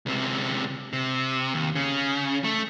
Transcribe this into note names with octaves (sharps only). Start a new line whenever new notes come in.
C#2 C3
C3
D#2
C#3
A3